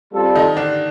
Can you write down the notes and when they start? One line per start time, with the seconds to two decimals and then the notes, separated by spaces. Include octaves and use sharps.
0.13 G3 C4 F4 A4
0.36 D#3 D#4
0.57 D3 D4